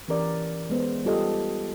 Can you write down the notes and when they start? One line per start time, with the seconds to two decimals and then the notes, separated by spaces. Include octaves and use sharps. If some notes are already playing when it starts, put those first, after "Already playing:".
0.08 E3 C#4 G4 A#4 D5
0.70 G#3 B3 C5
1.05 G3 F4 G4 A4 D#5